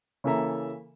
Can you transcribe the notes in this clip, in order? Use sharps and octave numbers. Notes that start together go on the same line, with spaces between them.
C#3 E3 A#3 A4 E5 A#5